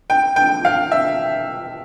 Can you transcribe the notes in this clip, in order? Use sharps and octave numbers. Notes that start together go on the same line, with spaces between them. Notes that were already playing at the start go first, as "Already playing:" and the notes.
G5
G5
F5
E5